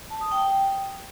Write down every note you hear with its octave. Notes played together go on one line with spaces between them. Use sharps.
A5
D#6
G5